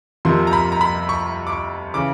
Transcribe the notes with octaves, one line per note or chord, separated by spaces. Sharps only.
F2 C3 F3 A#3 C6
A#5
B5
A#5
B5
C#6
D6
C#6
C#3 E3 D6